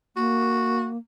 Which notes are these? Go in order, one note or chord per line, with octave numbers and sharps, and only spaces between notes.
A#3 F#4